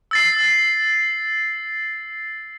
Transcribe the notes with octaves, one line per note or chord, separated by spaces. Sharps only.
E6 A6 C7